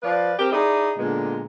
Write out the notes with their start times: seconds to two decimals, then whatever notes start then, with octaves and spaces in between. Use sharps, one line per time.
0.02 F3 B4 D5 F5
0.38 C4 G4 A#4
0.51 D#4 E4 G#4 D5
0.97 A#2 D3 G#3 B3